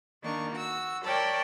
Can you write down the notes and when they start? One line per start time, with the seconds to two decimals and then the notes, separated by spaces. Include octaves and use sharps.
0.24 D#3 A#3 D4 A#4 C#6
0.53 F#4 E6
1.04 A#4 C#5 D5 G5 A5 B5